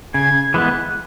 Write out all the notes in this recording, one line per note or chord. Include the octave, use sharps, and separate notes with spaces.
C#3 G#6
E3 G#3 B3 F#6